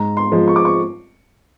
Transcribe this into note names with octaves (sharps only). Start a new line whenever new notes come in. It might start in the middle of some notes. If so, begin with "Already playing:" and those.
Already playing: G#2 A#5
C6
F3 G#3
C#6
D6
C#6